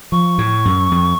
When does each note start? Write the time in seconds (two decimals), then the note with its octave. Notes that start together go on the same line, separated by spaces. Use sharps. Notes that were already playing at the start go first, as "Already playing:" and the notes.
0.12 F3 C#6
0.38 A2
0.65 F#2
0.92 F2